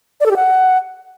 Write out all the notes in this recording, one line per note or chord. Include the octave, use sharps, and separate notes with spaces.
D5
A4
G4
F#5